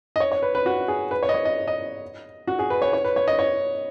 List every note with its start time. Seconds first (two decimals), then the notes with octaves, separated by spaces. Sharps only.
0.16 D#5
0.20 C#5
0.32 C#5
0.43 B4
0.55 B4
0.66 F#4
0.88 G#4
1.11 B4
1.23 C#5
1.29 D#5
1.34 C#5
1.45 D#5
1.68 D#5
2.47 F#4
2.59 G#4
2.70 B4
2.82 C#5
2.93 C#5
3.04 B4
3.16 C#5
3.28 D#5
3.39 C#5